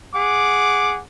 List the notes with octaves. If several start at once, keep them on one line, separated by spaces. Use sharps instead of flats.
G#4 F#5 D6